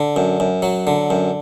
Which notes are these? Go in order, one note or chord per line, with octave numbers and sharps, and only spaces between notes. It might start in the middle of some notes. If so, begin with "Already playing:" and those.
Already playing: D3
F#2
F#2
F#3
D3
F#2